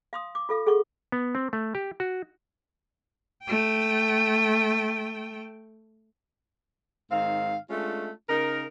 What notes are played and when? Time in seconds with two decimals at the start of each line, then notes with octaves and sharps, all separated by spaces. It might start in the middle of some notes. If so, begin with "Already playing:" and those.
0.13 F5 C6 D#6
0.35 D6
0.49 F4 A4 F5
0.66 G#4 A4 F#5 C#6
1.12 B3
1.35 C4
1.53 A3
1.75 G4
2.00 F#4
3.44 A3 G5
7.11 G#2 D#3 C4 F5
7.70 G#3 A3 C#4 D4 F4
8.29 C#3 D#4 A#4